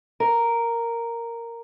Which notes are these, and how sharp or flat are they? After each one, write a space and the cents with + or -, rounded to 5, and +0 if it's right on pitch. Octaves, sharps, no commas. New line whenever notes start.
A#4 -5